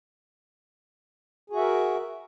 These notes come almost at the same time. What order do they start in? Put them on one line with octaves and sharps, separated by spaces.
G#4 F#4 E5 A#4